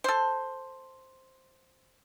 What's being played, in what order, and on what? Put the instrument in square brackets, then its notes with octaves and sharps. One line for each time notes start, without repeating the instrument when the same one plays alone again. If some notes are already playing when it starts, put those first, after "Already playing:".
[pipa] A4 C5